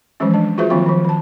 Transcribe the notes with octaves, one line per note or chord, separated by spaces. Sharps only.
E3 F3 G3 G#3 C#4
G3 D4
F4 F#4 G#4 B4 C5 E5
D#3 F3 F#3 A#3 C4 F4
D#3 F3
D#3 A5